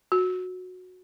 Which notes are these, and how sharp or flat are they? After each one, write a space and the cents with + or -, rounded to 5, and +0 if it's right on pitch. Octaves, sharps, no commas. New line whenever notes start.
F#4 -15